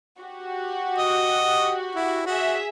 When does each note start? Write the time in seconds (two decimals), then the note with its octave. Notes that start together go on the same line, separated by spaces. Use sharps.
0.21 F#4 G4
0.99 D#5
1.96 E4
2.26 F#4 G#4 E5